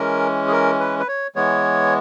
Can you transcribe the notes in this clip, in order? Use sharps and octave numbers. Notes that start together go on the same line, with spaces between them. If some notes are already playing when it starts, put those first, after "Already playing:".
Already playing: E3 G#3 C#4 A#4
G#4
A#4
B4
B4
C#5
E3 G#3 B3 C#5